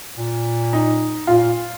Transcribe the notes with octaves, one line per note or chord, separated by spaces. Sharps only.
A#2
D#4
A#2 F4